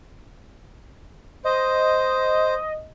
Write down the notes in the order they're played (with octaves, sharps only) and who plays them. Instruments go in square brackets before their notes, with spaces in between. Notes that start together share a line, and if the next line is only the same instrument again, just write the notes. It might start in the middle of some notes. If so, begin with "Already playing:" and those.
[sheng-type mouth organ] C5 [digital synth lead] D#5